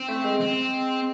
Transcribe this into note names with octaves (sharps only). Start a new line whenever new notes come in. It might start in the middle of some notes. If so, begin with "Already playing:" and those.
Already playing: C4
A3
G#3
C4